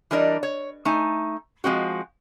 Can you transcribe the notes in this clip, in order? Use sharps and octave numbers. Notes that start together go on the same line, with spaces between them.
E3 G3 D4 A#4 D5 D#5
C#5
A3 D#4 G#5
F3 G#3 C4 F#4